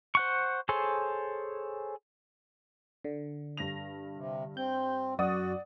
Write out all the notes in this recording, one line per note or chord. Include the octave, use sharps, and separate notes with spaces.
C5 F#5 C#6
G#4 A4 C5 C#5
D3
G2 A#6 F7
C3
C4 G6
F#2 F#4 D5 F#5 D#6